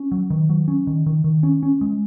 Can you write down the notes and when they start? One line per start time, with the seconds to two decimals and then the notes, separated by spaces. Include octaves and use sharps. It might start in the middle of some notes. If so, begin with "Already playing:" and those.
Already playing: C#4
0.12 F#3
0.30 D#3
0.49 F#3
0.68 C#4
0.87 D#3
1.06 D#3
1.24 D#3
1.43 C#4
1.63 C#4
1.81 G#3